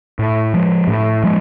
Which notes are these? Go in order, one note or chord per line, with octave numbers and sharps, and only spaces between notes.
A2
F3 G#3
A2
F3 G#3